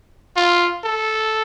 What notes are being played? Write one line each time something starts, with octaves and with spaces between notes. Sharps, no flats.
F4
A4